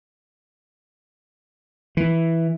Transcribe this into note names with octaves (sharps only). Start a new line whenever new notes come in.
E3